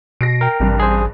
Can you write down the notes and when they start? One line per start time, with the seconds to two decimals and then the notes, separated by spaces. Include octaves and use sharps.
0.21 B2 A#6 C7 D7
0.41 A#4 G5
0.60 A1 G2 C3
0.80 G#4 C5